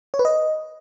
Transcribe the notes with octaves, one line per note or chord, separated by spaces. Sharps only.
C#5
B4
D#5